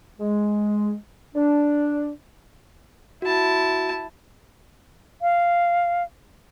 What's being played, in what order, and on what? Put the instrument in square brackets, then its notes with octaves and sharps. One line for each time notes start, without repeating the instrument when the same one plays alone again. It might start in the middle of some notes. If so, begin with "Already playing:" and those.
[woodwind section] G#3
D4
[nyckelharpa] E4 A5 [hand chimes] F#4
[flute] F5